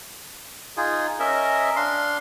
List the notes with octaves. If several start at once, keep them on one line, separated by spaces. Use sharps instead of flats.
D#4 F4 G#4
C#4 A#4 D#5 E5
D4 F5 C6